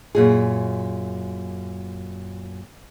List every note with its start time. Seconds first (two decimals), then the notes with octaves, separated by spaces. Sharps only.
0.15 F#2 A#2 G#4